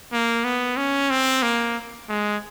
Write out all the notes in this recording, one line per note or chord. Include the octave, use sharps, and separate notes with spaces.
A#3
B3
C#4
C4
A#3
G#3